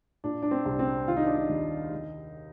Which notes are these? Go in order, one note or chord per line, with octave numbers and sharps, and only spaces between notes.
A#2 D4
D4
C4
C2
C4
D#3 F4
D#4
D4
D#4
D#2
D#3